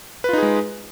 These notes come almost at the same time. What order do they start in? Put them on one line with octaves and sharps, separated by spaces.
B4 F4 D#4 G#4 G#3